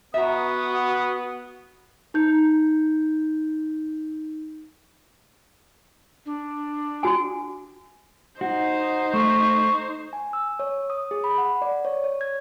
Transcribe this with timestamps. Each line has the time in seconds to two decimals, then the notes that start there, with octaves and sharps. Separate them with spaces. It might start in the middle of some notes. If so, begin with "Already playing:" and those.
0.14 B3 F#4 E5 A#5 D#6
2.14 D#4 G6
6.26 D4
7.03 F#4 G#5
8.41 D#4 F#4 C5
9.13 A3 C#6
10.13 G#5
10.33 E6
10.59 C#5
10.90 D#6
11.11 G#4
11.24 B5
11.38 F#5
11.62 D5
11.85 C#5
12.04 C#5
12.21 G#6